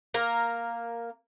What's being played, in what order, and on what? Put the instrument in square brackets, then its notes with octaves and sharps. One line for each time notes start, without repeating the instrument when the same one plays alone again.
[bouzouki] A#3 A#4